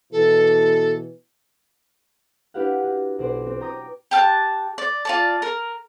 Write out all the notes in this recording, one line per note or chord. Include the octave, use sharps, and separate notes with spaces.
B2 E3 A4
D4 E4 G4 B4 F5 F#5
F#4
B1 C5 D5
C4
C#5 G5 A#5 D6 D#6
G4 A5 F6 F#6
D5
F4 D5 A5
A#4